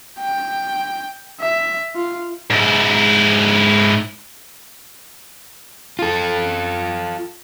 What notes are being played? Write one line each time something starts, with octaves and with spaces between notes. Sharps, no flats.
G5
E5
F4
G#2 E4
F4 A4